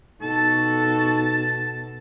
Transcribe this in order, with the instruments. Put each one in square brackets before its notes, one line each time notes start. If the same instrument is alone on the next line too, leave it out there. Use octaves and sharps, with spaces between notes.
[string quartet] B2 [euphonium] D#4 [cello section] F#4 A4 [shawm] A5